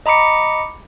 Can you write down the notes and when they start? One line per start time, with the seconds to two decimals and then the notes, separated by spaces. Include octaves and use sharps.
0.06 D#5 A#5 B5 D6 C#7